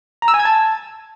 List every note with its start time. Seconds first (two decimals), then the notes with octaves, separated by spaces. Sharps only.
0.22 A#5
0.28 E6
0.34 G#5
0.40 G#6
0.45 A5